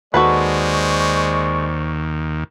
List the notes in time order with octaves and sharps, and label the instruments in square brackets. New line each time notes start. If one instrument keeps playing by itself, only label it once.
[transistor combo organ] D#2 [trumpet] G#3 [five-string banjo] F#4 A4 B4 [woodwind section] C5 D5 C#6